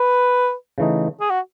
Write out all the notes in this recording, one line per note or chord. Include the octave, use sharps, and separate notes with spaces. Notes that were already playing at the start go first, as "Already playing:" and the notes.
Already playing: B4
C#3 E3 A3 D#4
G#4
F#4